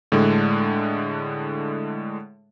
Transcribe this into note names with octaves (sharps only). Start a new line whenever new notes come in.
A2 D3 G#3